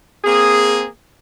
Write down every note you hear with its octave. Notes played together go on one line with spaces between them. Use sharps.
A#3 C4 G#4